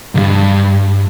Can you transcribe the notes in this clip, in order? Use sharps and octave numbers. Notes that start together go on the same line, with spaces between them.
B1 G2